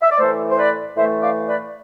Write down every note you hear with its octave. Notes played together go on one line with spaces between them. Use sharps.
E5
D5
A2 E3 A3 A4 C5
C5
B4 D5
A2 E3 A3 C5 E5
D5 F5
B4 D5